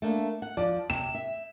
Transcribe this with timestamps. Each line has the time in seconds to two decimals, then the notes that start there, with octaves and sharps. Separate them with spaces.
0.02 A3 A#3 D4
0.42 F#5
0.57 F3 D5
0.90 C3 E7
1.15 E5